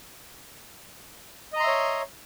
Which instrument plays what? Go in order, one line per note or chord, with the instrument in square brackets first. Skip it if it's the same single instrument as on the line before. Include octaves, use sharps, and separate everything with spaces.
[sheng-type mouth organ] D#5
A#5
C6
E5
C#5